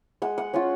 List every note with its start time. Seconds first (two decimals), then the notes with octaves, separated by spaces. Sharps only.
0.22 G#3 F#5
0.38 F#5
0.53 C#4 F4 F#5